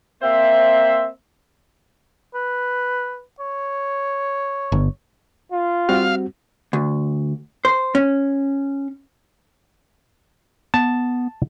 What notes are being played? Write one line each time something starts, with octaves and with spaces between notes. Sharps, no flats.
A#3 C4 C5 E5
B4
C#5
G1
F4
G3 C4 F#4 F5
D2
C5
C#4
B3 A5